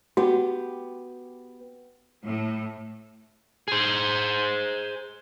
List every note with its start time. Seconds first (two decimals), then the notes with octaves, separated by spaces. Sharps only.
0.17 B3 F#4 G4
2.25 A2
3.68 G#4 C5